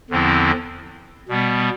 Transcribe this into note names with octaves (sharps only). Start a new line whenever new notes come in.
E2 D3 F3 C4 E4
B2 G3 B3